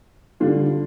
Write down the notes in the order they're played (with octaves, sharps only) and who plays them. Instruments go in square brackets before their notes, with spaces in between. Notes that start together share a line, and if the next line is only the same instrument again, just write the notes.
[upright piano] D3 G3 D4 F4